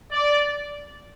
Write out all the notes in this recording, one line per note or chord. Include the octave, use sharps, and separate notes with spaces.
D5